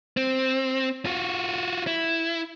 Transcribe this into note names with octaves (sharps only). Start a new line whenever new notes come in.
C4
F4 F#4
E4